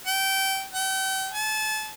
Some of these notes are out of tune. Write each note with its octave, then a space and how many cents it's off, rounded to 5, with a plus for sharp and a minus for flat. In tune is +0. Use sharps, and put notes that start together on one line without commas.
G5 -25
G5 -40
A5 -30